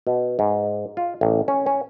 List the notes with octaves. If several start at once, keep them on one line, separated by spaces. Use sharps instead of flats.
B2
G#2
F4
A1
C#4
C#4